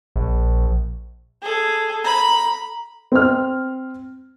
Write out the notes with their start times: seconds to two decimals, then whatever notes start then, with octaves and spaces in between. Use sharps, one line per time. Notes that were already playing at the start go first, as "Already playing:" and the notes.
0.16 A#1
1.42 G#4 A4
2.05 A#5 B5
3.12 C4 F6